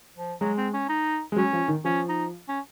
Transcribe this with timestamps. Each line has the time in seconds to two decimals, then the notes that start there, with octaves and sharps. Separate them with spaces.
0.17 F3
0.41 F#3 G#3
0.57 C4
0.73 C#4
0.89 D#4
1.32 G#3
1.36 F#3 C#4
1.53 F3
1.68 D#3
1.85 F3 C#4
2.09 D#4
2.49 C#4